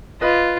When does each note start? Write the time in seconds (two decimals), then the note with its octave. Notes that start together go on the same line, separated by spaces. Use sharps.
0.21 F4 B4 D#5